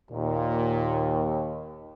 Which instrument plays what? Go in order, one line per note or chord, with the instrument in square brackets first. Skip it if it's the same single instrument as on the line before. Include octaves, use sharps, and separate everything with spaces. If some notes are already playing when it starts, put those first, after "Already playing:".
[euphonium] D#2 [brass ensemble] A#2